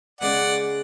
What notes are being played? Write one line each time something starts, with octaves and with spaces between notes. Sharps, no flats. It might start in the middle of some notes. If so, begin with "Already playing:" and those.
C#3 G#3 B3 D5 F#5